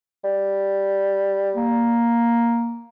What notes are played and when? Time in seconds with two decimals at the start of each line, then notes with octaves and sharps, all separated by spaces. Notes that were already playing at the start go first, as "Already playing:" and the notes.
0.24 G3
1.55 A#3